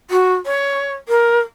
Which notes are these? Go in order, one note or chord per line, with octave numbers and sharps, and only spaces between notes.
F#4
C#5
A#4